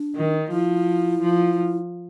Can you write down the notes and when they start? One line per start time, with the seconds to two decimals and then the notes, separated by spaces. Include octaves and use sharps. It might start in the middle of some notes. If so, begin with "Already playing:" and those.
Already playing: D4
0.16 D#3
0.51 F3 E4
1.22 F3